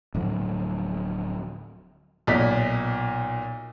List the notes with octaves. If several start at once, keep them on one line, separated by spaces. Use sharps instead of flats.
D1 A2 F3 F#3
B1 A#2 B6